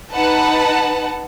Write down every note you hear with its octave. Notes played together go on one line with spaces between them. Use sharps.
D#4 B4 F#5 A5